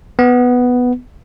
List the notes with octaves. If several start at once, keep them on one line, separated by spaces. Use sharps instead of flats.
B3